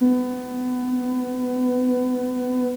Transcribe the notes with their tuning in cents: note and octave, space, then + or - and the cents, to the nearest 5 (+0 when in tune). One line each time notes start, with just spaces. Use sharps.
B3 +25